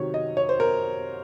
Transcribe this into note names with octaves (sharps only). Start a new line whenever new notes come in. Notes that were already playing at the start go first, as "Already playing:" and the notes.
Already playing: C3 D#3 F#3 C#5
D#5
C#5
C5
A#4